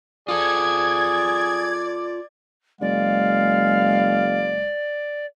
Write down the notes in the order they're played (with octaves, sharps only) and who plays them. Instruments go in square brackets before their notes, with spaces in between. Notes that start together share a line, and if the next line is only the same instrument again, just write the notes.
[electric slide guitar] F4 A4 [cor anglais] G#4 [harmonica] D5 D6 [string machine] G#6
[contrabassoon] F#1 [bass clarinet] G#3 [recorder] D5 [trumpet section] F5